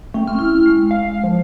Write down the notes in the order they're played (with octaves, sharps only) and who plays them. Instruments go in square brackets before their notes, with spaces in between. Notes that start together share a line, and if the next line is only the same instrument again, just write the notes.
[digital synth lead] A3 [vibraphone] C#4 G5
[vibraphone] C4 C#6 [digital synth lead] F6
[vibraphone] E4 [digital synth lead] F6
[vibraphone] G#3
[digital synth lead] F5
F3